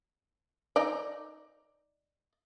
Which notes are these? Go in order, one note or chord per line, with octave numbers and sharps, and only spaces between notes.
D#4 D5